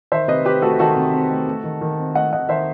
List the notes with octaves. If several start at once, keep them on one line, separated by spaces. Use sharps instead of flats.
D#3 C5 E5
C3 B4 D#5
C4 G4 B4
A3 F#4 A4
D#3 F#4 A4
C3
C4
A3
A3
D#3
D#3
C4
A3 D#5 F#5
D#3 D#5 F#5
D#3 C5 E5